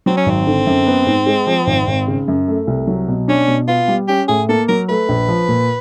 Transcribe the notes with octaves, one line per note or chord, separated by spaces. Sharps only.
F#3 C4
C#4
G#1 C4
D3
F#2
B3
G#2
G#3
F3
G#1
G#1
C#3
F#2
A3
C2
F#3
B2
C#4 D4
B2
B3 F4
G3
C#4 G4
A2 G#4
A#3 A4
F#3 A#4
A3 B4
A#1
F3
A#2